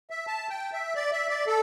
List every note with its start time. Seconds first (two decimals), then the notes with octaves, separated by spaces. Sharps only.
0.10 E5
0.27 A5
0.50 G5
0.73 E5
0.95 D5
1.12 E5
1.30 D5
1.47 A4